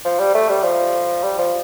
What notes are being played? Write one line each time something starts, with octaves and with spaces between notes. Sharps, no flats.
F3
G3
A3
G3
F3
G3
F3